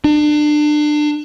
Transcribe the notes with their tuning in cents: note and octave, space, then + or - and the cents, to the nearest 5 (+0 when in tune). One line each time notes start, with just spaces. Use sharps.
D4 +30